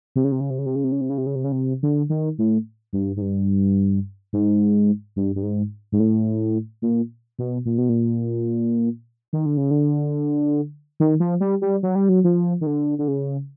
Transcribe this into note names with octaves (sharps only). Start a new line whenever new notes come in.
C3
C#3
C3
C#3
C3
C#3
C3
C#3
C3
C#3
C3
C#3
C3
C#3
C3
C#3
C3
D3
D#3
A2
G2
G#2
G2
G#2
G2
G2
G#2
G#2
A2
A#2
B2
A#2
B2
A#2
D#3
D3
C#3
D3
D#3
F3
G3
G3
F#3
G3
F#3
F3
D#3
D3
D3
C#3